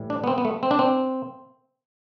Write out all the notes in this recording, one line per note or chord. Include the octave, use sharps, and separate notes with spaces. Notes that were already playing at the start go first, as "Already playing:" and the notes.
Already playing: A2 E3 G3
D4
B3
C4
B3
A3
C4
D4
C4